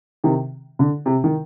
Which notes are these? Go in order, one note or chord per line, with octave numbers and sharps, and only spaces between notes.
C3 D#3
D3
C3
D#3